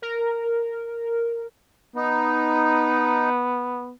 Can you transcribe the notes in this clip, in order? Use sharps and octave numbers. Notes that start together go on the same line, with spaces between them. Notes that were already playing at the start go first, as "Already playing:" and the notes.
A#4
B3 D#4